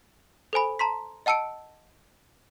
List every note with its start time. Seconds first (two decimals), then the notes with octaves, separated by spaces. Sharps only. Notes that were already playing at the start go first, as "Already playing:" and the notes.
0.53 A4 C5 G#5 B5
0.79 A5 A#5 C6 B6
1.26 D#5 F#5 A5 E6 C#7 D7